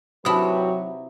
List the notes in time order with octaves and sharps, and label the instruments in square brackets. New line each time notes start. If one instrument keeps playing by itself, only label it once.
[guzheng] C3 E4 [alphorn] F#3 [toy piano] D#4 D#6 [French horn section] F#4 G4 B4